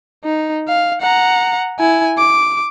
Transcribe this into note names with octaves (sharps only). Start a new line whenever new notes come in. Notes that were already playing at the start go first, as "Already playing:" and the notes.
D#4
F5
F#5 A#5
E4 G#5
D6